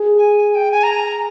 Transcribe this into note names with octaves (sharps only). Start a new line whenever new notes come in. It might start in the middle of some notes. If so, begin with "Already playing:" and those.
Already playing: G#4
G#5
G#5
G5
G#5
A#5